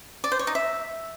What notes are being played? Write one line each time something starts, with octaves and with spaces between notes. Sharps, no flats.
D5
C5
C#5
D#4
E5